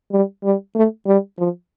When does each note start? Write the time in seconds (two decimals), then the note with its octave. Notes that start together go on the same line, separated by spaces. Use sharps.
0.12 G3
0.44 G3
0.75 A3
1.06 G3
1.39 F3